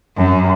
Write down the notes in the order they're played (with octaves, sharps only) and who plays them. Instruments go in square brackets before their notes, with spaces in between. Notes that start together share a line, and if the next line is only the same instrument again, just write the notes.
[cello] F#2